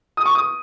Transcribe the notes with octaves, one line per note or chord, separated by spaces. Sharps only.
D#6
C#6
D#6